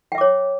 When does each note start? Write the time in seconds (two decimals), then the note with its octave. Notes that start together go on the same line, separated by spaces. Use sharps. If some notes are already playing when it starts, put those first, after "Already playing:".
0.12 G5
0.15 E5
0.18 D6
0.21 C#5